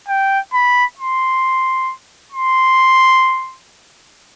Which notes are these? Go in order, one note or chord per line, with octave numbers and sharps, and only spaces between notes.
G5
B5
C6
C6